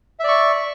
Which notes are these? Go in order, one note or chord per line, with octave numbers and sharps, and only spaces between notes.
D5 E5 C#6